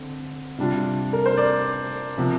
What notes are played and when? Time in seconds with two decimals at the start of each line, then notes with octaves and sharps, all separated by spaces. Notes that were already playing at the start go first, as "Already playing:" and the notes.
Already playing: D3 C4
0.58 C3 G3 D4 F4
1.13 A#4
1.26 C5
1.37 D5
2.17 C3 F3